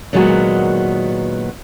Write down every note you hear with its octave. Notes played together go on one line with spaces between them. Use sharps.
A#2 D#3 F#3 G#3 B3 F#4